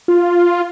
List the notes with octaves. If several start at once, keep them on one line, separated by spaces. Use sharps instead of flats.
F4